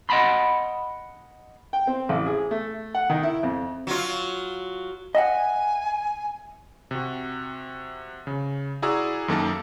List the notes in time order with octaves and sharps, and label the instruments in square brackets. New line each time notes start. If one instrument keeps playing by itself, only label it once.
[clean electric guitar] D#5 F#5 G#5 A5 B5 C6
[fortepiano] G5
C4
A1
G#4
A3
F#5
D#3
E4
F2
[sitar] F#3 F4
[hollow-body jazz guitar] D#5 E5 F#5 [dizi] G#5
[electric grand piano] C3 F#4
C#3
E4 F#4 G#4 D5 A#5 E6
F#2 D#3 A#3 A4 A#4 A5